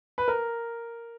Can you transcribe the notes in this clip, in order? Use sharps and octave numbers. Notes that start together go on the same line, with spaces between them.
B4
A#4